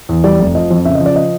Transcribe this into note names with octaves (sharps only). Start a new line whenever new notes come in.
E2
G3 D5
F1
F3 D#5
F2
C#3 E5
D#5
F3
D5
D#5